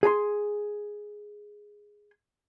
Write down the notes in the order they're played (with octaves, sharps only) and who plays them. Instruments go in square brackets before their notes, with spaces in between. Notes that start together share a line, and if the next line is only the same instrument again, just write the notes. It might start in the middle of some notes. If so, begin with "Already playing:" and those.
[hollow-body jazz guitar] G#4 G#5 A#5 C6